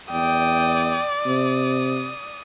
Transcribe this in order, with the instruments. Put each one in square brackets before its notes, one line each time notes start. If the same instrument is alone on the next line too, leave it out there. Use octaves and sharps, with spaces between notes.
[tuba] E2 [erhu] D5 [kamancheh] G5 D#6
[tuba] C3 [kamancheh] D#6